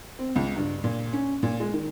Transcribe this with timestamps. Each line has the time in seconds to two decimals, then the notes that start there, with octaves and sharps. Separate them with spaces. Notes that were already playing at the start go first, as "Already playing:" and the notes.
0.19 C4
0.36 C#2
0.56 G2
0.84 A#2
1.13 C#4
1.43 A#2
1.60 G#3
1.73 D#3